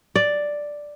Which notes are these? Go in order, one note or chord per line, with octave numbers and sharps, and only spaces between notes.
D5